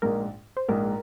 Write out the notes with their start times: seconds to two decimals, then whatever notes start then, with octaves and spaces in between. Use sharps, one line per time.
0.02 A#1 G#2 G#3 A#4
0.57 C5
0.68 A#1 G#2 G#3 A#4